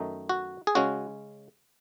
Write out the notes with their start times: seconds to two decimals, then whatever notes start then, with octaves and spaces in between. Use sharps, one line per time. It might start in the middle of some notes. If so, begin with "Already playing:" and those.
Already playing: F#2 D#3 A3 D#4
0.29 F#4
0.67 G#4
0.75 C#3 G#3 C#4 F#4